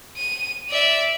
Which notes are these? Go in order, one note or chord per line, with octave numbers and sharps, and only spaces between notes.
D#7
D5 E5